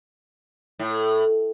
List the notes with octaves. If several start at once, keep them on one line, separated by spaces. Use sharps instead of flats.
A2